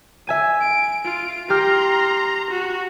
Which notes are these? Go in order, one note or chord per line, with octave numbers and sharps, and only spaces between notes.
E5 G#5 D#7
D7
F4 D7
G4 A#5 C6 F6
F#4